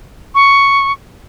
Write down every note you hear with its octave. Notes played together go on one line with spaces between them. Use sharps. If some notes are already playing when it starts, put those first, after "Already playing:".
C#6